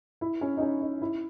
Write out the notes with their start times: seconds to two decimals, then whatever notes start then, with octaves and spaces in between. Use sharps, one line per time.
0.21 E4
0.41 C#4
0.57 D#4
0.61 C#4
0.81 D#4
1.02 E4